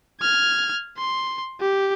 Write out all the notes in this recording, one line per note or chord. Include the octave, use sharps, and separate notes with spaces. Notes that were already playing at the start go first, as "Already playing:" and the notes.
F6 G#6
C6
G4